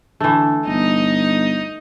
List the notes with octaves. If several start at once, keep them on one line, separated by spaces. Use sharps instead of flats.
D3 E3 A3
G1 D#4 D#5